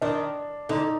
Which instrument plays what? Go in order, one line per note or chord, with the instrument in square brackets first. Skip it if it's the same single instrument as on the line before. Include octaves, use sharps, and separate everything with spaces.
[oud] D#3 [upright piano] D4
[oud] D3 [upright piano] D#4